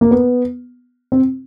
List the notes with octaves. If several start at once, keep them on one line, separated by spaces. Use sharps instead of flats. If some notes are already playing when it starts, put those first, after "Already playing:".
A#3
B3
C4